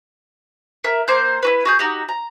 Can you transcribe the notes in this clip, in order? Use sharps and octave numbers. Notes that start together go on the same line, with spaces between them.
A#4 E5
A#3 C5 G6
E4 F#4 B4
F#4 G#4 G6
D#4 F#4 G4
A#5